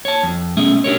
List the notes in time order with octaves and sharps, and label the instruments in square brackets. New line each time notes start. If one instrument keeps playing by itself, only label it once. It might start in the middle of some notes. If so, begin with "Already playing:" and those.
[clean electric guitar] C#5 A5
F2
B2 A3 C#4 G#4 E5
D4 G4 A#4 C#5